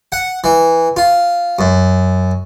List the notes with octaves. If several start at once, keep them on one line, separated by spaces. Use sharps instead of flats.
F#5
E3
F4
F#2